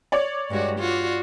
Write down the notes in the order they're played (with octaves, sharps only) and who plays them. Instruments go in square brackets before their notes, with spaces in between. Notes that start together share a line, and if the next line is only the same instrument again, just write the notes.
[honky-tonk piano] C#5 D5
[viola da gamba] G2 G#3 F#4
F4 F#4